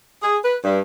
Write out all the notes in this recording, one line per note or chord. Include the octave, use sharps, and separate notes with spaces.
G#4
B4
G2